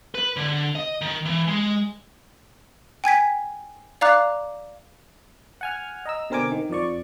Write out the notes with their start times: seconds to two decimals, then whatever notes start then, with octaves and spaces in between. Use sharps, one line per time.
0.15 B4
0.36 D3
0.75 D#5
1.01 D#3
1.25 E3
1.48 G#3
3.04 G5 G#5 G#6 B6
4.01 D5 F5 A#5 D6 F#6
5.61 F#5 G#5 F6
6.05 D#5 A#5 E6
6.30 B2 D3 C4 A#4 G#5 D6
6.52 D#3
6.70 F2 F3 D5 C#6